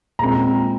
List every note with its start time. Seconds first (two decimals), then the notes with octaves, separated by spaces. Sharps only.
0.19 A#2 G#3 C4 A#5